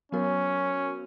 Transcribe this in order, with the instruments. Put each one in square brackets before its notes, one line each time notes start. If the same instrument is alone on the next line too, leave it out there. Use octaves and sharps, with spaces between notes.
[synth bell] F#3 B3 F#4 A#4 C#5 [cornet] C#4